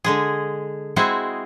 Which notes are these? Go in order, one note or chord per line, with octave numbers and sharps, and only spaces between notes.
D3 G#3 G#4
G#3 C4 E4 F#4 G#4